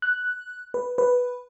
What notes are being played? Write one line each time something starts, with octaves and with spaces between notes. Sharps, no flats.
F#6
B4
B4